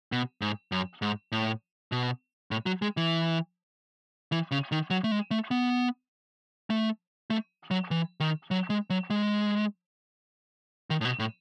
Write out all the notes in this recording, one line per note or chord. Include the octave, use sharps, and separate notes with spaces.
B2
G#2
F#2
G#2
A2
B2
A2
F#3
G#3
E3
E3
C#3
D#3
F#3
A3
G#3
A3
B3
A3
A3
F#3
E3
D#3
F#3
G#3
F#3
G#3
D#3
A2
B2
A2